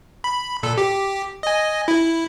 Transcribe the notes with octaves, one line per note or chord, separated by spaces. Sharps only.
B5
A#2 A4
G4
D#5 G#5
E4